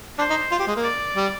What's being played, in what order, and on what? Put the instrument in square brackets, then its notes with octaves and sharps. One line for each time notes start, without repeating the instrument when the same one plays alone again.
[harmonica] D4 [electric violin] C5
[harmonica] D#4
F4
G4
G#3
A#3
[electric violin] D5
[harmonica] G3